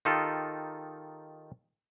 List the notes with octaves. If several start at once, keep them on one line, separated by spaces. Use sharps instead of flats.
D#3 D#4 F4 G4 A4